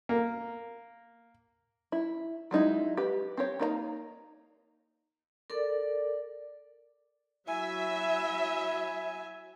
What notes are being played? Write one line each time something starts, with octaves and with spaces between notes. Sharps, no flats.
A#3
E4
F#3 G#3 D#4 E4
G4 B4
C4 G4 C#5
A#3 D#4 D5 A#5
A4 A#4 D5
F#3 E4 E5 G#5